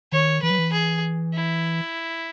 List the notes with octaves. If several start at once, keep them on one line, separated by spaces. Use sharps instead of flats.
D#3 C#5
E3 B4
F#3
E3
G#4
E4